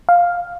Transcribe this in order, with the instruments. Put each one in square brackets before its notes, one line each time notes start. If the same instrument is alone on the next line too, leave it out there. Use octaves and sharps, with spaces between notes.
[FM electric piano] F5